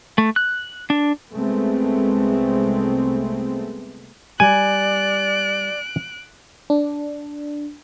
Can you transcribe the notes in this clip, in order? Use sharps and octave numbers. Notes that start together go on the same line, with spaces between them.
A3
F#6
D4
C2 G#3 A3 B3 C4
G3 D5 G#5 F#6 D7
D4